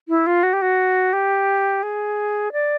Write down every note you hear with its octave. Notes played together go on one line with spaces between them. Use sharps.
E4
F4
F#4
G4
F#4
G4
G#4
D5